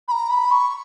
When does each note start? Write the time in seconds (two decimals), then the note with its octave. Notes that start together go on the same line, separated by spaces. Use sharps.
0.08 B5
0.11 A#5
0.29 B5
0.51 C#6